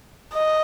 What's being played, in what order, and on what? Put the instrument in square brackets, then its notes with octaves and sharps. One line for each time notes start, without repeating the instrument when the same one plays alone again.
[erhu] D#5